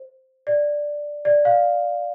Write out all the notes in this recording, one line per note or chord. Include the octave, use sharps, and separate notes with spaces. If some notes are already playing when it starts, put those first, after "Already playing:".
Already playing: C5
D5
D5
F5